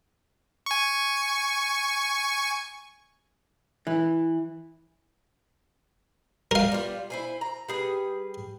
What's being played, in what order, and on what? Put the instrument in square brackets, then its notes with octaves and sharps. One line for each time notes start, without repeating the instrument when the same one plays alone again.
[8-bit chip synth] G#5 C#6
[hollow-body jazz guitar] E3
[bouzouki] G3 [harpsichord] A#4 F5
[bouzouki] G3 B3 F4
E4 C5 G#5
A#5
G3 G#4 B4